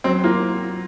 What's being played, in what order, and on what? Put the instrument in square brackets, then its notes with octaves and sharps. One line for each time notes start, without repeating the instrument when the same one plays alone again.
[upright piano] F#3 [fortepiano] C4
[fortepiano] A#3 [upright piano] F4